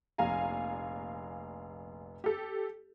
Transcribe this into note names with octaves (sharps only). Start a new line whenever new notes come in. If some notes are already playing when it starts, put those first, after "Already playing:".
F1 A#1 F5 G#5 A#5
G4 A4